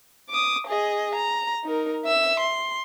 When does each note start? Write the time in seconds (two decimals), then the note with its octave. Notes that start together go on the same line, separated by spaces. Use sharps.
0.30 D6 D#6
0.67 G#4 D#5
1.15 A#5
1.64 D#4 A#4
2.05 E5 E6
2.40 C6